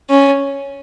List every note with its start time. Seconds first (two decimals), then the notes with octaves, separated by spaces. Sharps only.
0.10 C#4